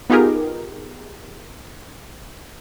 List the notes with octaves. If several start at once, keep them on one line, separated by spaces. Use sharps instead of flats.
B3 D#4 F4 G4 G#4 A#4